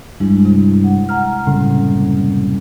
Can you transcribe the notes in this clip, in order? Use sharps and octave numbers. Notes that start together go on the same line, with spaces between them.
G2 G#3 E4
C3
F#5
F#5 A#5 F6
F#1 C2 A2 C#3